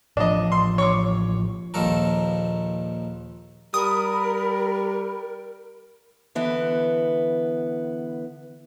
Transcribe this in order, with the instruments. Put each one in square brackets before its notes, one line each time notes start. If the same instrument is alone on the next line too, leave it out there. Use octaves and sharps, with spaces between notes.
[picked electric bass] A1 F3 [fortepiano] D4 D#5
[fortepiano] C6
C#5 C#6 D6
[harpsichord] A#1 D#2 D#3 F3 A4 A#4
[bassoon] G3 [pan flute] A#4 [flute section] A#5 B5 [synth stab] D#6
[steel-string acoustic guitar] D3 E3 B3